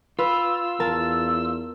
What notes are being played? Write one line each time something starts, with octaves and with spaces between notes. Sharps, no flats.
F4 B4 E6
E2 A#4 A5